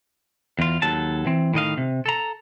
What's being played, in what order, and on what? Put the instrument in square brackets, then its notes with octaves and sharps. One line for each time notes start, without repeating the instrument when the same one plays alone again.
[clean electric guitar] E2 F4
D#2 F#3 A4 A5
E3 C4
A2 D#3 D#5 F5
C3
A4 A#5